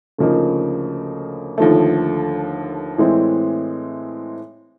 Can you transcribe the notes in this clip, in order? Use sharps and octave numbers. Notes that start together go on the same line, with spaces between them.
D2 C#3 F3 A#3 D#4
D#2 D3 F3 A3
A2 E3 G#3 C4